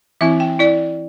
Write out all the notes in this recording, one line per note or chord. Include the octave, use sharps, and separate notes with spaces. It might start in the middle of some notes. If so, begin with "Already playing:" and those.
E3 C4 E4 E5
G5
E4 D5